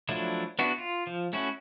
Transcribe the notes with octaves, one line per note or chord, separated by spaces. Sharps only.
F3 F#3 A3 D4 E4
B3 D4 E4 F#4
F4
F3
A3 C#4 E4 F#4